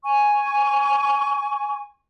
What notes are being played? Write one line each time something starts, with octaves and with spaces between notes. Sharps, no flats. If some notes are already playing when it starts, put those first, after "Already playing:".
G#5 C#6